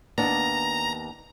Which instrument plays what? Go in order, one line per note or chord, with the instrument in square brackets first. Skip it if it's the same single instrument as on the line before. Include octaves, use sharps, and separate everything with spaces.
[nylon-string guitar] D#2 B3 D4 [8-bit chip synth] A#5